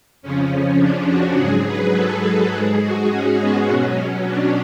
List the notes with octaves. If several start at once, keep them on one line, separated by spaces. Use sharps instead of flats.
F2 C#3 F3 C#4
D4
F#4
G#2 F#3 G#4
B4
A4
G#4
G#3
G#2
F#4
C#4
B3
B2 F#3 C#4
D4